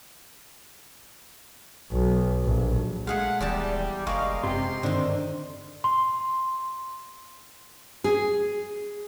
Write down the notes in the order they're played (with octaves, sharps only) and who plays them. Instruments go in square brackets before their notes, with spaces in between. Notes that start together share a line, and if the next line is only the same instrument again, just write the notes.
[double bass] B1
A#1
[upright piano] G#3 [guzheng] A3 G#4 F5 [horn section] F#5
[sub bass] D#1 [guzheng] E2 D5 A5 [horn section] G3
[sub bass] F#1 [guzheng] G#3 D5 [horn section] A#4 D#5 F5 [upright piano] C#6
[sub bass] F#2 [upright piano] C3 G4 [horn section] C6
[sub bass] G2 [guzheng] D3 D#3 [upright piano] C4 D#4
[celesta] C6
[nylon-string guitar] G#4